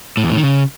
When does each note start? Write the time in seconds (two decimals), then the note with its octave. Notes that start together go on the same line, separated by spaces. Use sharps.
0.17 A2
0.24 E2
0.30 A2
0.37 D#3
0.43 C#3